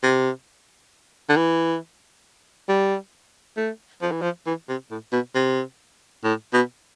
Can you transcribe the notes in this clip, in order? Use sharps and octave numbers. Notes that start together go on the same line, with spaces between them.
C3
D3
E3
G3
A3
F3
E3
F3
E3
C3
A2
B2
C3
A2
B2